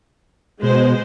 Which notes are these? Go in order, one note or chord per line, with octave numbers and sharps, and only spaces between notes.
B2 G#3 C5